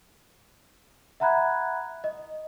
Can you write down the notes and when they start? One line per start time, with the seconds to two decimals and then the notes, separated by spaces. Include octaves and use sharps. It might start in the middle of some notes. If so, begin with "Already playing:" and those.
1.20 E5 F#5 A#5 B5 F#6 G#6
2.04 D#5